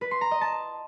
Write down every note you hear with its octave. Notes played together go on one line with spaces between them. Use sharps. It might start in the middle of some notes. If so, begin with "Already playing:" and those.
B4
C6
A#5
D#5
A5